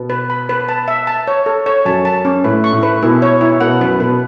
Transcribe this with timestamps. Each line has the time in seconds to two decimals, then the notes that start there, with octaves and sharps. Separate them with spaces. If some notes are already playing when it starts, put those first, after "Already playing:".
Already playing: B2 B3
0.10 B4
0.30 B5
0.49 B4
0.69 A5
0.88 E5
1.07 A5
1.28 C#5
1.46 A4
1.66 C#5
1.85 F#2 F#3 A5
2.05 A5
2.25 C#4
2.44 A2 A3 B4
2.64 C#6
2.73 A2 A3
2.83 B4
3.03 B2 B3 E4
3.22 C#5
3.41 E4
3.61 B2 B3 F#5
3.80 F#2 F#3 B4
4.00 B2 B3 B4